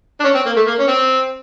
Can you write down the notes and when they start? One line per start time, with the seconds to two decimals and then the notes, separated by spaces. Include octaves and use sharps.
0.20 D4
0.24 C#4
0.35 C4
0.46 A#3
0.56 A3
0.67 A#3
0.79 C#4
0.88 C4